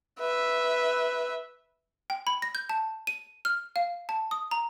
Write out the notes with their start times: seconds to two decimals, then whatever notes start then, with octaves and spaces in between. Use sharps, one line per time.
0.19 B4 E5
2.10 G5
2.27 B5
2.42 A#6
2.55 G6
2.69 A5
3.07 D#7
3.45 F6
3.76 F5
4.09 A5
4.31 D#6
4.51 A#5